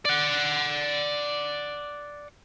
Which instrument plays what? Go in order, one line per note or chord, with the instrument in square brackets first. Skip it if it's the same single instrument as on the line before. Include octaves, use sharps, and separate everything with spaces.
[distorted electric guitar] D5 F#5